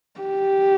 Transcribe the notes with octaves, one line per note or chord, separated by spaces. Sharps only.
G4